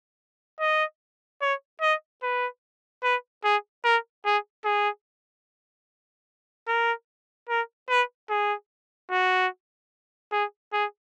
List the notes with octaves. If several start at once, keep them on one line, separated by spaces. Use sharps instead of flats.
D#5
C#5
D#5
B4
B4
G#4
A#4
G#4
G#4
A#4
A#4
B4
G#4
F#4
G#4
G#4